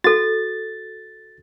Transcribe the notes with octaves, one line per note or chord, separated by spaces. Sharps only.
F#4 A4 A6